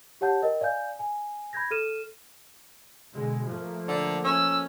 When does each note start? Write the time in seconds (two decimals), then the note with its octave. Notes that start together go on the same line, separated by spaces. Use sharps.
0.21 G4 C#5 F#5 A5 G6
0.42 A#4 D#5 G5
0.61 D5 F5 G#5 G6
0.99 G#5
1.53 B5 G6 G#6 A#6
1.71 A4 F6 D#7 E7
3.14 B2 D3 G#3
3.47 F3 A3 A#3
3.88 D3
4.24 C#4 E6